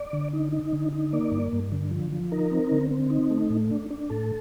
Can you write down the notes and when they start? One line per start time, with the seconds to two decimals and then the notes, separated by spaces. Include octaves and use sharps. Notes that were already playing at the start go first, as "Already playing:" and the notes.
Already playing: D5
0.13 D3
0.33 D#4
0.52 D#4
0.73 D3
0.92 D#4
1.13 A#3 D5
1.31 G2
1.53 G2
1.72 D3
1.91 F3
2.12 F3
2.32 D#4 A#4
2.51 C4
2.72 D3
2.91 C4
3.10 D#4
3.30 A3
3.50 A2
3.71 D4
3.90 D4
4.10 A2 A4